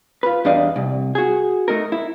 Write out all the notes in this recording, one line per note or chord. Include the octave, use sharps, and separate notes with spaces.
F4 B4
E2 G3 D4 D#5 F5
C2
F#4 G#4
A3 D#4 A#4
E4